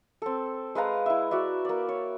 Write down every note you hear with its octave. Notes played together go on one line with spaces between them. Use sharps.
C4 A4
G#3 B4 F5 A#5
E4 E5
F#4 D5 E5
A#3 D5
C#5